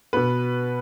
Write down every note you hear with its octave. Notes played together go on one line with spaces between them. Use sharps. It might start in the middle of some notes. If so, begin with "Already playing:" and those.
B2 B3 B4